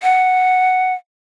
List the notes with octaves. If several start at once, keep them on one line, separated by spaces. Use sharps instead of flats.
F#5